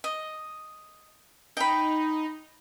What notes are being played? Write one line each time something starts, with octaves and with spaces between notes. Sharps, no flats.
D#5
D#4 G5 B5